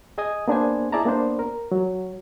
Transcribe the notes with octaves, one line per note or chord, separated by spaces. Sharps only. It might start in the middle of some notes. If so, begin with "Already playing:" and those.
G#4 D#5 G#5 D#6
A#3 B3 D4 G#4 C5 G#5
E4 G#4 D5 E5 A5 A#5
A#3 B3 D4 C5
A#4
F#3